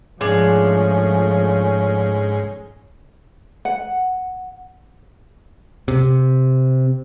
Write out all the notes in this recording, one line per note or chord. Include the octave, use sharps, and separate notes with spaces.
G#2 F3 A3 C#4 D4 G#4
F#5
C3